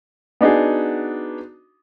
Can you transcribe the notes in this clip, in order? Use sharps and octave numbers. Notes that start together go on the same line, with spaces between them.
B3 D4 D#4 F#4 G#4